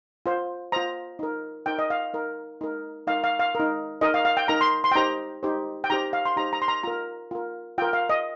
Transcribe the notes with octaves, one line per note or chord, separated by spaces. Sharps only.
F4 C5
F4 C5 A#5
D#4 A#4
D#4 A#4 G5
D#5
F5
D#4 A#4
D#4 A#4
D#4 A#4 F5
F5
F5
D#4 A#4
D#4 A#4 D#5
F5
F5
G5
D#4 A#4 A#5
C6
C6
G5
D#4 G4 C5 A#5
D#4 G4 C5
G5
D#4 G4 C5 A#5
F5
C6
D#4 G4 C5 A#5
A#5
C6
A#5
F4 A#4 A#5
F4 A#4
F4 A#4 G5
F5
D#5